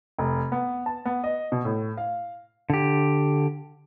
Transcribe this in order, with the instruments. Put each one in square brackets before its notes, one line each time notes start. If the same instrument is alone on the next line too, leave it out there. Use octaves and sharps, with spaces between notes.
[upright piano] F1
B3
A5
B3
D#5
B2
A2
F5
[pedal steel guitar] D3 G4